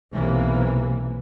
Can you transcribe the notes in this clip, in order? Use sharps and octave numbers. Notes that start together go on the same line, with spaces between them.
B1 C3 E3 A#3